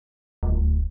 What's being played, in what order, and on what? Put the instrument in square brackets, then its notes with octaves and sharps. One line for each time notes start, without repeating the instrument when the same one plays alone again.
[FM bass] D#1 [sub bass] D2